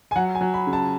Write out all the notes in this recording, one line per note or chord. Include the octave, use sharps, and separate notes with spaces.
G#5
F#3 F#5
G#5
F#3
B5
C#3
A5